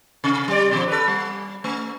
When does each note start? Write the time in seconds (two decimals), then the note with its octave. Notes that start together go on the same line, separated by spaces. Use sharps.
0.24 C3
0.48 G3 D5
0.71 B2 F3
0.88 A4 B4
1.08 G3
1.64 A3